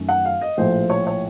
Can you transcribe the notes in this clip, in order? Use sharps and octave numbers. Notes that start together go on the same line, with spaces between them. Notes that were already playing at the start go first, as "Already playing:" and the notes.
Already playing: F#2 D#3 A3 C#4
F#5
F5
D#5
A#1 A2 F3 C5
C#5
C#5